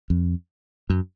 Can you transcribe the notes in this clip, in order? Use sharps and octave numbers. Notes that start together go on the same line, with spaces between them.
F2
F#2